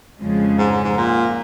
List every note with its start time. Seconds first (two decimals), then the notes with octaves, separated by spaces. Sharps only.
0.20 F2 C#3 F3 G#3
0.58 G#2
0.72 G#2
0.84 G#2
0.97 A#2